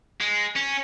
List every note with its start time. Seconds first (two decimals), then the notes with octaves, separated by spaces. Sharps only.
0.20 G#3
0.56 C#4